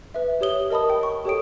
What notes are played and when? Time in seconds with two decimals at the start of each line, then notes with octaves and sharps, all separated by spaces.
0.14 B4 E5
0.41 G4 C#5 D#6 G7
0.70 A#4 D#5 A5 B5 D#6
0.90 G5
1.03 C#6
1.25 G4 A4 C#5 G5 D#6 D7